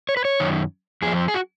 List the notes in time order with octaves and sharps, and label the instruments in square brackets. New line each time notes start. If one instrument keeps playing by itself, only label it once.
[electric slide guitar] C#5
B4
C#5
F#2 D#3
F2 F3 G#4
G#4
F#4